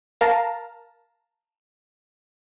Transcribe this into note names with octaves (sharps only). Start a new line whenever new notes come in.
A#4 F5 A5 A#5